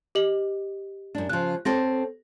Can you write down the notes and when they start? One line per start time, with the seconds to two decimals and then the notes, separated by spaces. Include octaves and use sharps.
0.15 G4 D#5 F#7
1.15 F#2 D4
1.29 C#3 F3 F#6
1.65 C4 A4 C#5 A#6